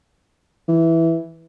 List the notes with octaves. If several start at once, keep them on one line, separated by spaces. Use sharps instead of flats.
E3